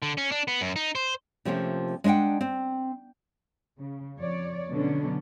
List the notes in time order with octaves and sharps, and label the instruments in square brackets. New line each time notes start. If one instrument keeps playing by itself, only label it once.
[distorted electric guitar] D3
C#4
D4
B3
F#2
D#4
C5
[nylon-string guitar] C3 F3 A3 A#3 C#4 F4
G#3 D4 D#5 F#5 G5
C4
[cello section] C#3
F2 C#5 D5
B2 D3 F#3 C#4 D4